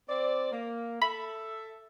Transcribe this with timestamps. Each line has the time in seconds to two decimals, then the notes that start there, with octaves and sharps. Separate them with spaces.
0.09 C4 D5
0.52 A#3
1.02 A4 E5 B5